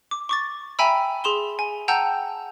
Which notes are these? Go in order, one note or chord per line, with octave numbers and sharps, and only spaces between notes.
D6
C#6 D6 A6
E5 G5 G#5 A#5 B5 E6
G#4 C6 E7 G7
G#5
F#5 G5 A5 A#5 E6 G6